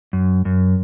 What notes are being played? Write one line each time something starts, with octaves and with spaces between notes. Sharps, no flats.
F#2
F#2